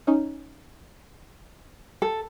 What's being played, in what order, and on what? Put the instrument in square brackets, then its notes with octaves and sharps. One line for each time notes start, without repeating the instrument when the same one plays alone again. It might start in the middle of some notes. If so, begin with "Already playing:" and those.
[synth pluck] C#4 D#4
[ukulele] A4